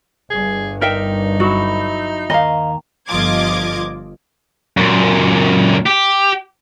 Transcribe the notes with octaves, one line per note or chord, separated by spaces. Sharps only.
G1 G2 G#4
D#4 A#4 E5 G5
F#3 E4 F#4
D#2 A#4 D#5 F5
G1 F3 F4 D#5 D6 G#6
F#2 A#2
G4